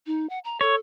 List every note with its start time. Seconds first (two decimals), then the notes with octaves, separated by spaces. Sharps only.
0.07 D#4
0.30 F#5
0.45 A#5
0.61 A4 C#5